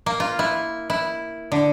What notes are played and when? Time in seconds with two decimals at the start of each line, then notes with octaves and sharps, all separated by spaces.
0.06 A#3
0.20 F4
0.39 E4
0.90 E4
1.52 D3